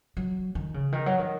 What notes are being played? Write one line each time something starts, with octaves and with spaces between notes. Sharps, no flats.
F#3
D#3
C#3
D#3
F#3
D#3